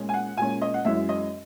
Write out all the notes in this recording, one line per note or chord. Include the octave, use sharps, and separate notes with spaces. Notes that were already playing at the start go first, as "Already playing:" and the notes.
Already playing: A#2 G#3 C#4
G#5
F#5
A#2 G#3 C#4 G#5
D#5
F#5
F#2 E3 G#3 C#4 E5
D#5